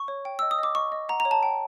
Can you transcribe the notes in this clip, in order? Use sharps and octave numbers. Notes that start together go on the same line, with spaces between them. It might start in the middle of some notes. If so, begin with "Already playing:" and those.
Already playing: C#6
C#5
G5
D#5 E6
D#6
D#5 D6
D#5 C#6
D#5
F#5 A#5
A#5
C#5
A5
G5